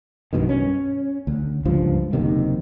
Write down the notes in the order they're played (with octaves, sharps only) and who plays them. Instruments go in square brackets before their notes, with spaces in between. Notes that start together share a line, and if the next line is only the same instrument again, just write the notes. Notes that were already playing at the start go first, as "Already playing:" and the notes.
[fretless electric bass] B1 G2 B2 D#3
C#4
D2
C#2 G2 F3
F#1 D#2 C3 D#3